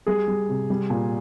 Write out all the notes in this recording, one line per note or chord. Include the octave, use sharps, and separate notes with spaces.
G3 G#4
G3
C3
G3
A#2